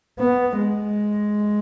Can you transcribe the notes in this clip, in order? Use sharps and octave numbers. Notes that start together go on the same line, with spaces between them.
B3
G#3